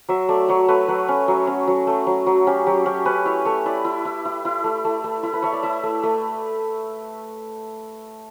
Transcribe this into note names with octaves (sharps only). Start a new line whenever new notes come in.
F#3 E5
A3 D5
F#3 C#5
A3 B4
F#3 B4
C#4
F#3
C#4
F#3
A3
F#3
F#3
C#4 G4
F#3 G4
C#4 G4
C#4 B4
E4 C#5
A3 C#5
E4 D5
E4
E4
E4
E4
A3
A3
A3
E4
B4
A3 C#5
D5
E4 E5
A3
A3